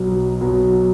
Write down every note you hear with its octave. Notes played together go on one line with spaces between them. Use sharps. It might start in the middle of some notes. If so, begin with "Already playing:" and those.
Already playing: B1 B2 F#3
B1 B2 F#3